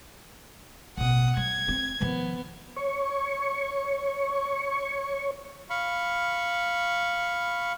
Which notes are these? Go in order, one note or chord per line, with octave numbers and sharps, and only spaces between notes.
A1 B2 F#5 D#6
F#3 G#6
C4
D#3 F3 B3
C#5 C#6
F5 B5 C#6